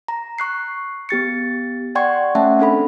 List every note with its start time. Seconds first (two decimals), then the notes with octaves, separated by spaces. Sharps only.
0.08 A#5
0.39 C#6 F#6 C7
1.09 B3 G4 A6 C#7
1.95 D5 F#5 G5 C6 C#6 G#6
2.35 A3 C#4 E5 F#5 A5
2.59 C4 D4 A4 B5